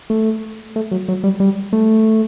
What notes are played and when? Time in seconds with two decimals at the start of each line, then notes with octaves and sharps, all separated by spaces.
0.10 A3
0.76 A3
0.92 F#3
1.08 F#3
1.24 G3
1.40 G3
1.73 A3